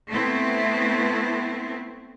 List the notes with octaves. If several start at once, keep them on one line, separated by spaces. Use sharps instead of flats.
A3 B3 C4 E4